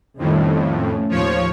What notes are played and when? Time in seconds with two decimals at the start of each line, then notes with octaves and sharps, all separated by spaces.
0.19 F2 A2 D#3 G3 C#4
0.76 A3 C#4
1.09 D#2 A2 F3 C#5